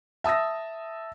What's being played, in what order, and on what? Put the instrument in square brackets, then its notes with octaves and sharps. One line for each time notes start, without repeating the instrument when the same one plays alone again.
[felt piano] E5 A5 D#6 E6 A#6